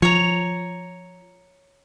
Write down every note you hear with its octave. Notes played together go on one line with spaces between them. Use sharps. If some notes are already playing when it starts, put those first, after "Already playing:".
F3 C#5 A#5